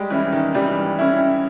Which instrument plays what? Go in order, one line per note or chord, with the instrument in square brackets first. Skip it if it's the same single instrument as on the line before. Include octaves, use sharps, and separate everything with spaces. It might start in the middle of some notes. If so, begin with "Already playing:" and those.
Already playing: [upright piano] G3 [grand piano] G#3 G4
[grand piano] E3 [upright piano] C#4 E4
[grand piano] D#3
[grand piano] E3 [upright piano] G3
[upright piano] C#4 E4